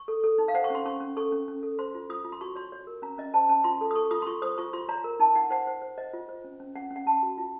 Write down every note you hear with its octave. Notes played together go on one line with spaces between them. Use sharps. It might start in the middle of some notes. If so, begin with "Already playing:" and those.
Already playing: C#6
A4
A4
D#4
F5
C5 F#5
C#6
C#4 C6
C#4 C#6
C#4
A4 C#6
C#4
C#4
A4
C5 C6
F4
F4 D#6
F4
C6
F#4 C#6
C#5 C6
C#5
A#4
C#4 A#5
C#4 D#5
C5 A5
C#4 A5
F4 C6
A4
D#6
A4 C#6
F4 D#6
C6
F4 C#6
C5 D#6
F4 C#6
F4 C6
C#5 A#5
A#4
D#4 A5
D#4 F#5
C5 F#5
C5
C5
C5 D#5
F4
C5
C#4
C#4
C#4 F#5
C#4
F#5
C#4 A5
F#4
F4